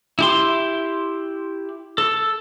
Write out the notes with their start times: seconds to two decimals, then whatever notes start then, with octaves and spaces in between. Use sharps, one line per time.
0.19 E4 G4 C6
1.98 A4